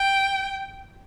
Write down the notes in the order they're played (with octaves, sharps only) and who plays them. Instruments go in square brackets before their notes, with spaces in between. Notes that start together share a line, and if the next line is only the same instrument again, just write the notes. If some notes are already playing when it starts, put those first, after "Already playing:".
Already playing: [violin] G5